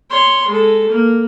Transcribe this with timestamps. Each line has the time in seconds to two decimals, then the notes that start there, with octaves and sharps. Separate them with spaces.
0.10 C#5 C6
0.48 G#3 A4
0.90 A#3